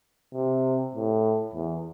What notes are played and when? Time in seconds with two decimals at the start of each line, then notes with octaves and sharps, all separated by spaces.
0.34 C3
0.95 A2
1.54 E2